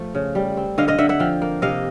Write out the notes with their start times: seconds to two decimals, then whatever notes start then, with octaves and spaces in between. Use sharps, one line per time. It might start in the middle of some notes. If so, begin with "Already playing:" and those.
Already playing: F3 A3
0.15 C#3
0.35 G3
0.57 C4
0.78 D3 D#5 F5
0.88 D#5 F5
0.98 D3 E5 F#5
1.09 E5 F#5
1.20 F3 F5 G5
1.42 A#3
1.62 C3 D#5 F5